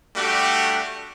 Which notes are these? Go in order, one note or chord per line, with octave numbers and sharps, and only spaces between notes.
G3 A3 D4 F#4 G4